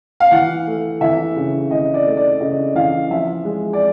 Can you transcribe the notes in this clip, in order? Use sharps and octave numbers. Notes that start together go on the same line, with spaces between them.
F5
E3 F#5
A3
E3 E5
C#3
E3 D#5
D5
A3
D5
C#3 D#5
E3 F5
F3 E5
G#3
D5